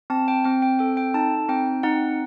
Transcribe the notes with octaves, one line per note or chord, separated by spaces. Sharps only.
C4 A5
G5
C4 G5
G5
A4 G5
G5
D#4 A5
C4 G5
D#4 F#5